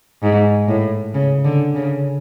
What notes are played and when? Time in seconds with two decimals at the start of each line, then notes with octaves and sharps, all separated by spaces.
0.23 G#2
0.68 A2
1.14 C#3
1.45 D3
1.75 C#3